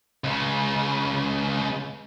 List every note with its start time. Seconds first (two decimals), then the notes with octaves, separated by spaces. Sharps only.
0.24 C#2 C#3